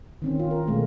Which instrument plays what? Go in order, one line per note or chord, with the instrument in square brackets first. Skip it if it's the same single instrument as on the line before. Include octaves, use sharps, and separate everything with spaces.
[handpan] D#3 C4 C#4
F4
A#4
B2 G#3 A3